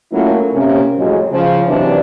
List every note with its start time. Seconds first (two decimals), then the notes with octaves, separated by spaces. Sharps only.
0.12 F#3 A3 A#3 C#4 E4 F4
0.52 C3 A#3 C#4
0.98 F2 A2 F#3 G#3
1.31 C#3 F3
1.67 D#2 C3 E3 F#3 D4